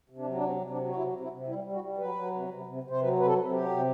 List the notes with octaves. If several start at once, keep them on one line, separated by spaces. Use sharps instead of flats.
C3
D4
F#3
D4
C3 C4
C3
D4
F#3
F#4
C3 E4
C3
E4
C3
G3 E4
G3
F#4
G3
F#3 B4
F#3
C3
C3
C3
C3
C5
F#3 B4
C3 B4
A4
C3
F#3 G4
C3